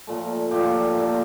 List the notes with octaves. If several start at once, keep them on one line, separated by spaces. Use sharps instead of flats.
A#2 F3 A3
A#2 F3 A3 G4
A#2 A3